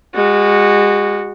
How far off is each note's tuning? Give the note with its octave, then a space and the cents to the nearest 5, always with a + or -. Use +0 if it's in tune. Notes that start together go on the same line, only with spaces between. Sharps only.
G#3 -30 F#4 +0